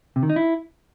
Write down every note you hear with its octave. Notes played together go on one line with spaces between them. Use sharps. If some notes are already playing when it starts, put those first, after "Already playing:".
C3
D#3
D#4
E4